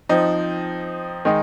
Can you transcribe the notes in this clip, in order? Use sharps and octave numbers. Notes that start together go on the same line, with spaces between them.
F3 C4 D#4
D#3 G#3 D#4